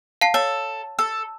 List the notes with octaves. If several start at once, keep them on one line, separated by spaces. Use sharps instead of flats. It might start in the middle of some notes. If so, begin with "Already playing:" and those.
F5 A5 C7
A4 C#5
A4